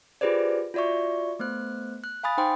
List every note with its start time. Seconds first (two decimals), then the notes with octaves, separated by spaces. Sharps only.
0.21 F4 G4 G#4 B4 C5 D5
0.74 F4 F#4 D5 E5 C#6
1.39 A3 B3 C5 F#6
2.04 F#6
2.23 F5 G#5 B5 D#6 A6
2.38 D#4 C5 G5 C6 D#6